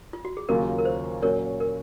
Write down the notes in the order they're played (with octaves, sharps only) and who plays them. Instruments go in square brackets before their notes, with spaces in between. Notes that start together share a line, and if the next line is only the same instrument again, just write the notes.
[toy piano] F4
F#4
G#4
[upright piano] D#2 C#3 F#3 A#3 F4 [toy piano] A#4
[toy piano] A#4
C5
[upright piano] A#2 F#3 C#4 F#4 [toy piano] A#4 C#5
[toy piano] A#4